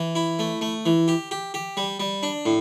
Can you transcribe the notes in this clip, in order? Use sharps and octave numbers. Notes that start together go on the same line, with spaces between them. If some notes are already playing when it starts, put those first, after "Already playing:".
Already playing: E3
E4
A3
A3
E3
G4
G4
G4
G3
G3
D4
A2